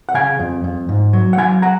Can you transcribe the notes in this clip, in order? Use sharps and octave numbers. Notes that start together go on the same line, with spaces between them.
F#5
C#3 F5 G#5
F2
F2
G#2
F#3
F#5
F#3 F5 G#5
F#5 A#5